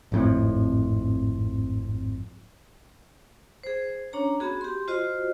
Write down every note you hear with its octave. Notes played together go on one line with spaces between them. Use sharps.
G#1 F2 A2
G#4 C5
C#4 D4 C#5 A#5
B3 F#4 G#4
G4 C6
F4 F#4 C5 D#5